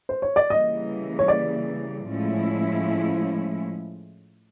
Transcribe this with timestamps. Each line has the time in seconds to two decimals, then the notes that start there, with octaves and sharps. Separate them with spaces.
0.09 C5
0.22 C#5
0.36 D5
0.50 C#3 E3 G3 A#3 D#5
1.19 C#5
1.28 D5
2.08 A2 F3 G#3 C#4 E4